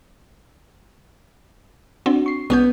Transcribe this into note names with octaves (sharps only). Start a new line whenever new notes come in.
C4 D4 F#4
C#6 C7
B1 B3 C#4 G6